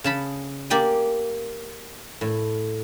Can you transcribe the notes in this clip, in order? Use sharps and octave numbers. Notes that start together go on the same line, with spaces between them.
C#3 A5 B5
A#3 G4 D5 G5 G#5
A2